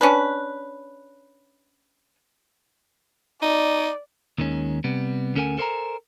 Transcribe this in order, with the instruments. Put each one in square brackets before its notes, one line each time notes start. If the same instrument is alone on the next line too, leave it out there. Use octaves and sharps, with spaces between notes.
[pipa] C#4 D4 B4
[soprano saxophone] D#4 [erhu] D5
[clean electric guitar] D#2 D#3 G#3 C#4
C3 G3 B3
D2 C#4 A4 A#4 F#5 G#5
A4 A#4 C5 D5 G#5 A#5